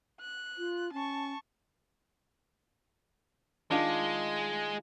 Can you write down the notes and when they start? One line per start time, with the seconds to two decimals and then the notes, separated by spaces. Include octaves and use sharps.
0.20 F#6
0.58 F4
0.93 C#4 A5 C#6
3.71 D#3 G#3 D4 F4